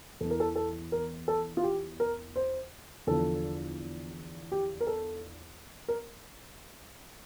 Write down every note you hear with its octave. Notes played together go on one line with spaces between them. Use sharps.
E2 E3 A4
A#4
A4
A4
A#4
A4
F4
G4
A#4
C5
E2 D3 F3 A4
G4
A#4
A4
A#4